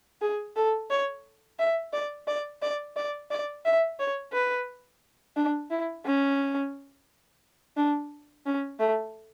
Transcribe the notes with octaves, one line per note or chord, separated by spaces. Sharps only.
G#4
A4
C#5
E5
D5
D5
D5
D5
D5
E5
C#5
B4
D4
E4
C#4
D4
C#4
A3